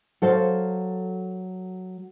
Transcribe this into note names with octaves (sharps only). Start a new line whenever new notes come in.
F#3 A4 C5 F5